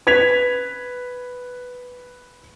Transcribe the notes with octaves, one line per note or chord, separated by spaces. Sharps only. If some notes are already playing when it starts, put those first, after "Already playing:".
B4 G#6 B6 F7